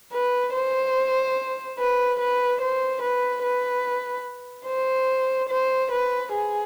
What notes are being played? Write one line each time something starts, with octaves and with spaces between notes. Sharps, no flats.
B4
C5
B4
B4
C5
B4
B4
C5
C5
B4
G#4